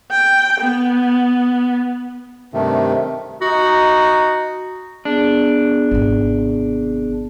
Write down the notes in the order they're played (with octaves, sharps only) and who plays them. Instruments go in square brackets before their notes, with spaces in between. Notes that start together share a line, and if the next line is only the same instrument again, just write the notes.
[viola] G5
B3
[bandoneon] G2 C3 D#3 A3
[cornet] D#4 [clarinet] F#4
[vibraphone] B3 G#4 [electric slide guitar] D4
[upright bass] G#1 C3